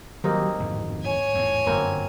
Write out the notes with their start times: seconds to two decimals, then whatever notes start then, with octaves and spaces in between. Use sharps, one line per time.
0.24 D#3 F#3 G3 A#3 C4 D#4 G4
0.60 D1 F2 G#2 D#3
1.03 C#5 G#5
1.34 E2 A2
1.66 G1 F#2 F#3 A#3 C4